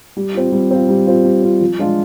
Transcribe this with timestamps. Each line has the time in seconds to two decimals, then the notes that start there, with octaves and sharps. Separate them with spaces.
0.17 G3
0.34 C4 F4
0.52 G3
0.71 C4 F4
0.89 G3
1.07 C4 F4
1.25 G3
1.43 C4 F4
1.61 F3
1.79 G#3 D4 F4